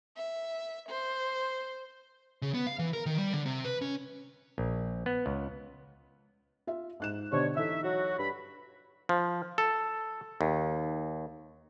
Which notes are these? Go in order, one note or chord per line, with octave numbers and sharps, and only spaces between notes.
E5
C5
C#3
B3
F5
E3
A#4
D#3
G3
D3
C3
B4
C#4
A#1
B3
C#2
F4 E5
G#2 F#6 E7
B2 D3 D4 G4 C5 C#5
E3 D#4 A4 E5
F#3 F#4
G2 B5
F3
A4
D#2